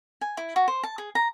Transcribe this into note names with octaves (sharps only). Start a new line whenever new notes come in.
G#5
E4
F#4
C5
A5
G#4
A#5